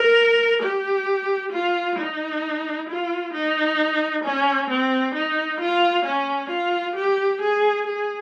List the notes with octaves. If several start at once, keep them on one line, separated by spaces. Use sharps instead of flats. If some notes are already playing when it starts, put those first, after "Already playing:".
Already playing: A#4
G4
F4
D#4
F4
D#4
C#4
C4
D#4
F4
C#4
F4
G4
G#4
G#4